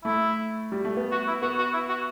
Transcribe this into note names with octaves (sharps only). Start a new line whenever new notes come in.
A3 E4
G3
A3
B3
F#4
E4
B3 F#4
F#4
E4
F#4